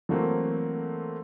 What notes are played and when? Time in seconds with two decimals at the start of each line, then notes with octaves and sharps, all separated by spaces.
0.09 E3 F#3 A3 A#3 C4